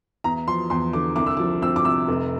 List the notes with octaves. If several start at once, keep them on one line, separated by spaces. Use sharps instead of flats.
E2 A#5
F3 C6
E2 C6
D3 D6
C2 D6
E6
F3 D6
C4 E6
D6
C3 E6
F1